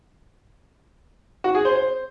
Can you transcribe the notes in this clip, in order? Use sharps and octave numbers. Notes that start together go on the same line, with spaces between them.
F#4
G#4
C5
C5